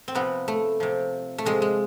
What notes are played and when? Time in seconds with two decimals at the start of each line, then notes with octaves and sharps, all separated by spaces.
0.08 C4
0.15 C3 F3 B3
0.48 A3
0.80 C3 F3
1.38 A3
1.45 C3 F3 G#3
1.62 G#3